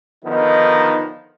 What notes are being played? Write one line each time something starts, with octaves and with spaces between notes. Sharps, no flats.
D3 D#3 F3 B3 D#4